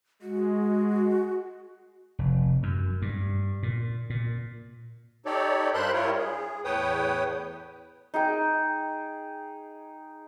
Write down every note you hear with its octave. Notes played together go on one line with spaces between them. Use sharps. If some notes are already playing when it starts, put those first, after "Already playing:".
G#3 F#4
F1
F#2
G2
A#2
A#2
D#4 G4 A4 C#5 D5
G2 A#4 C5 B5 C6 F#6
G3 E4 F4 A#4 C#5
G#4
E2 A2 B4 C#5 G5 D#6
D#4 G#4 G5